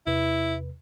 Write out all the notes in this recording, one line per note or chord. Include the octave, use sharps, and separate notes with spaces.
E2 C3 E4 B4